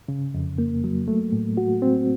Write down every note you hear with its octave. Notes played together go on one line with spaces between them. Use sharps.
C#3
F2
A#3
F#3
A3
A2
F#4
C4